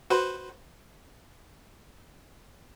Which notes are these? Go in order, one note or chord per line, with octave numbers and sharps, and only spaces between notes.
F#4 B4 C5